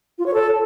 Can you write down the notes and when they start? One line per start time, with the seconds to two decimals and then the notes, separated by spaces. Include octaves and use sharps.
0.18 F4
0.26 C#5
0.34 A4